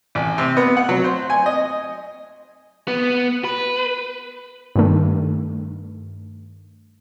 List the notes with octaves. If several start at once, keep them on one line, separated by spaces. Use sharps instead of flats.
A1
C3
B3
F#5
F#3
C5
G#5
D#5
B3
B4
G2 D#3 A3